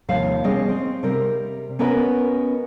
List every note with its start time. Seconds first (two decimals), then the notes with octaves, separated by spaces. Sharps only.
0.09 D#2 C3 F3 G3 F5
0.44 G3 B3 C#4 G#4 D#5
0.69 C4
1.03 C3 G3 A#4
1.79 B3 C#4 F#4 A#4 B4 D#5